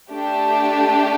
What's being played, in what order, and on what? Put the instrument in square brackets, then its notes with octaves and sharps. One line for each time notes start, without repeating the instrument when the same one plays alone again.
[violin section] A3 D4 G4